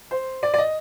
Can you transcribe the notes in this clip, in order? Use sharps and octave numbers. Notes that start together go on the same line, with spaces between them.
C5
D5
D5
D#5